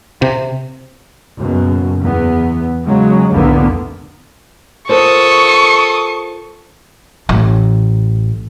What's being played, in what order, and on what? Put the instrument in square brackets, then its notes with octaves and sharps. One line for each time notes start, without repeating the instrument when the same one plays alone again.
[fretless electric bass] C3
[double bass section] F#1 F#2 B2
E2 B3
C#3 F#3 G#3
F1 C2 A2 D3 A#3 B3
[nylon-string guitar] F4 A#4 C5 [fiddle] A4 D#6 [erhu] C#6
[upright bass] A1